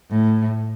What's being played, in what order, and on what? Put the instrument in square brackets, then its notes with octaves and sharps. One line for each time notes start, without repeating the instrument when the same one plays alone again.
[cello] A2